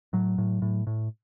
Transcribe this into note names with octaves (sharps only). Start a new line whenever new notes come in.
A2 F#3
A2
A2
A2